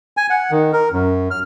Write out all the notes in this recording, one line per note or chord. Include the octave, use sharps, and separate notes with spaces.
G#5
F#5
D#3
A#4
F#2
F6